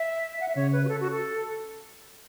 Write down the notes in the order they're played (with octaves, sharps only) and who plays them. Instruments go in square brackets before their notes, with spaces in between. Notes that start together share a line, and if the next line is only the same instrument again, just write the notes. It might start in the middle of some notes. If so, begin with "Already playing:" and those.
Already playing: [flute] E5
F#5
E5
[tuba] C#3 [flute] C#5
[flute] B4
F#4
A4
F#4
A4